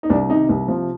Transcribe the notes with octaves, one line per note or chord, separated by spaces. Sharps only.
D#4
C2 D4
C3 D#3 D#4
C2
C3 F3